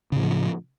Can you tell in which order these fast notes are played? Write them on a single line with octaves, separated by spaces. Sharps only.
C#3 A2 E3 F3